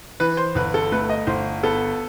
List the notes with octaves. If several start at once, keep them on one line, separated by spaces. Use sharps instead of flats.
E3 B4
C5
G1 B4
A4
A3 B4
D#5
G1 C5
B3 A4